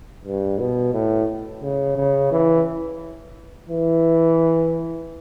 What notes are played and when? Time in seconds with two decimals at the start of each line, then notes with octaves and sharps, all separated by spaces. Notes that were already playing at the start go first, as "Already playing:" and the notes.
0.25 G2
0.59 B2
0.93 A2
1.63 C#3
1.96 C#3
2.32 E3
3.69 E3